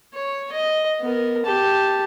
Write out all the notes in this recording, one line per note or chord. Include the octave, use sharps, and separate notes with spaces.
C#5
D#5
B3 A#4
G4 A5